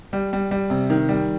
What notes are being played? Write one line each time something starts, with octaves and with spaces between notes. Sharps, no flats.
G3
G3
G3
C3
D#3
G3